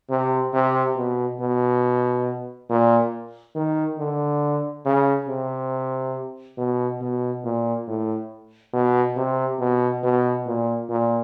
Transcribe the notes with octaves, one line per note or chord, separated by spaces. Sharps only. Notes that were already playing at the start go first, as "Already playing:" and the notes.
C3
C3
B2
B2
A#2
D#3
D3
C#3
C3
B2
B2
A#2
A2
B2
C3
B2
B2
A#2
A#2